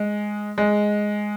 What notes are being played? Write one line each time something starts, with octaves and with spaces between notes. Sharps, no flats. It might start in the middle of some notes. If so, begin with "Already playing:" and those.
Already playing: G#3
G#3